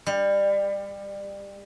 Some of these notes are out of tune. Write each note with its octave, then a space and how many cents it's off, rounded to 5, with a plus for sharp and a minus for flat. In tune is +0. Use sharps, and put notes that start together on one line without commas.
G3 +25